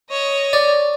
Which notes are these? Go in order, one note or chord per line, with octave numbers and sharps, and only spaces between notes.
C#5 D#5
D5